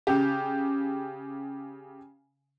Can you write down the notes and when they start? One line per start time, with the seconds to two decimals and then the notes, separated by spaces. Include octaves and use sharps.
0.07 C#3 G4